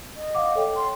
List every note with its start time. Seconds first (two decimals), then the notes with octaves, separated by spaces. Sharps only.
0.16 D#5
0.35 F5 F#5 D6
0.55 A4 C#5 G5
0.76 C6